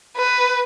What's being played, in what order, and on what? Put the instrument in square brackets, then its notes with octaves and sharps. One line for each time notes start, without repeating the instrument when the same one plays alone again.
[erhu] B4